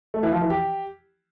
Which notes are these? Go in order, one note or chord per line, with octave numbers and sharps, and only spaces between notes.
A3
E3
F3
E3
G4